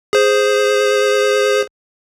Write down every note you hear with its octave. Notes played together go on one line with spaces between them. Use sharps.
G#4 C5